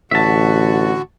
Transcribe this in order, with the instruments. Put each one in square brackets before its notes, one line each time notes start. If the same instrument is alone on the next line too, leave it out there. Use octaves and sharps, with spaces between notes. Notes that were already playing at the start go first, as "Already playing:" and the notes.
[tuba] A1 [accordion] D3 F#4 [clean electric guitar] E5 A5